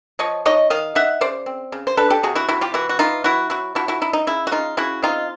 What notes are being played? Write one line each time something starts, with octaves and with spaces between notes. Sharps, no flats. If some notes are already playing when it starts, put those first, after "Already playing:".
F3 C#5 D#5
D#4 C#5 D#5
D#3 D#5 F5
D#4 E5 F#5
C#3 C5 D5
C4
C#3
C5
D4 A4 B4
G4 A4
C3 F#4 G#4
E4 F#4
C3 E4 F#4
F4 G4
E3 E4 F#4
F#4
E3 D#4 F4
F#3 E4 F#4
F#3 E4 F#4
F3 E4 F#4
E4 F#4
D#4 E4
D#4
C#3 E4
F#4
C#3 D#4 F4
C#3 E4 F#4
C4 D#4 F4